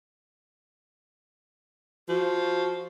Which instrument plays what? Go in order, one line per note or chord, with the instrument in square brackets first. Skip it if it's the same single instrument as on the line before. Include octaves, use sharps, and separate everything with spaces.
[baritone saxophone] F3 [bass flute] F#4